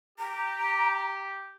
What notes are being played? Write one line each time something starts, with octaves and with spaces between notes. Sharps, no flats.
G4 A#5